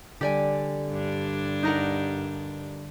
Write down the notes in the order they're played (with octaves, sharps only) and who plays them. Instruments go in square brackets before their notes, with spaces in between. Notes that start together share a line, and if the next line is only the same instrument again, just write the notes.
[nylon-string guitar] D3 G3 [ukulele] G4 D5 G#5
[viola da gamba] G2 D4
[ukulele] D#4 A#4 F#5